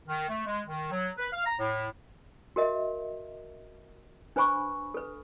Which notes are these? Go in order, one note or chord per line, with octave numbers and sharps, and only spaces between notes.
D#3
A3
G#3
D#3
F#3
B4
F5
A#5
A2
F#4 A#4 D#5 E5
D4 B4 C5 G#5 B5 C#6
A4 B4